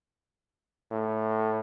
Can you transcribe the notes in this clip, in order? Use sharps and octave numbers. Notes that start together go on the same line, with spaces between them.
A2